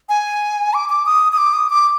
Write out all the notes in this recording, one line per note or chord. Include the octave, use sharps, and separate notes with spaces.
G#5
D6
D6
D#6
D#6
D6
D#6
D6